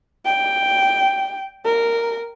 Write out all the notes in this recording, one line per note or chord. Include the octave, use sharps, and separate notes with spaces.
G5
A#4